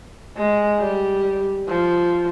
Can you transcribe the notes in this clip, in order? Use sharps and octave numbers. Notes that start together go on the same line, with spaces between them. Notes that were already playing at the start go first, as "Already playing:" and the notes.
G#3
G3
F3